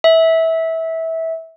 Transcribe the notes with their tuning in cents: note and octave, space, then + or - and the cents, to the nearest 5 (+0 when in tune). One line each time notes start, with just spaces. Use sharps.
E5 -20